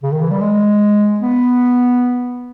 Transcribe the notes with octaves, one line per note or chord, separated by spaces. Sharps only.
C#3
D#3
E3
G3
G#3
B3